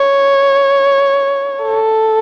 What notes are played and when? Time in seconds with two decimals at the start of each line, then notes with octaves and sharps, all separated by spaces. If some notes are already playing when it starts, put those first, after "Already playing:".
Already playing: C#5
1.62 A4